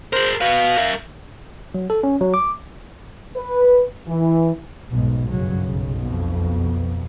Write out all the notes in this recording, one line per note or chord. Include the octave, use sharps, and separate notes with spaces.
G#4 A#4 C5
F#4 B4 F5
A#4 E5
F#3
A4
C#4
F#3
D6
B4
E3
B1 G#2 B2
G1 F#2 C#3 F#3
B1
F2 B2